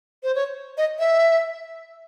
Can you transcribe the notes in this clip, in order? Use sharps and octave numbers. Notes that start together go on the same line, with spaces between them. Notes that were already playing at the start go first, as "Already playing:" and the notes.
C5
C#5
D#5
E5